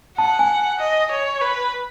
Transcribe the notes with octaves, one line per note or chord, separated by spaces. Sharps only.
F#5 A5
G#5
D#5
C#5
B4